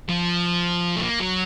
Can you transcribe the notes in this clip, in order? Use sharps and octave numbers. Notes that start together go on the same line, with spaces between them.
F3
A3
A#3
F#3